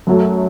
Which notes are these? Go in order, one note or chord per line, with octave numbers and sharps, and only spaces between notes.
F#2 F#3 A3